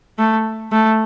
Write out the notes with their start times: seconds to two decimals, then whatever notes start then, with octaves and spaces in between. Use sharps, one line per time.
0.18 A3
0.72 A3